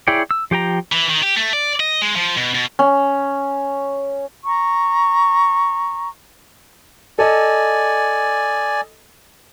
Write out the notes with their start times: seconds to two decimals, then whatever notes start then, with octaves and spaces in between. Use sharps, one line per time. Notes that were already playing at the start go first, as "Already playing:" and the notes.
0.08 E4 G#4 C#5 D5 G5
0.31 E6
0.51 F3 G4 G5 A#5
0.92 E3
1.09 D#3
1.23 G4
1.37 A3
1.53 D5
1.80 D#5
2.02 G#3
2.16 F3
2.37 B2
2.55 B2
2.79 C#4
4.45 A#5 C#6
7.19 A4 D5 D#5 G#5